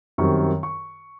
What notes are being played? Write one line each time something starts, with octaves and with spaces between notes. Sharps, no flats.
F#2 D#3 G3 C4 C#6
C#6